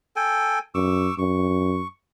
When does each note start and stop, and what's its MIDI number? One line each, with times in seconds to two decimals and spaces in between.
0.16 0.59 69
0.16 0.59 79
0.16 0.59 80
0.75 1.10 42
0.75 1.14 85
0.75 1.14 86
0.75 1.14 88
1.18 1.83 42
1.18 1.88 85